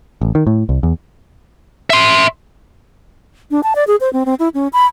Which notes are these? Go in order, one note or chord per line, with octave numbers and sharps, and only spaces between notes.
A1
D#3
A2
C2
E2
E5 C6
D4
A5
D5
G#4
C5
C4
C4
E4
C#4
B5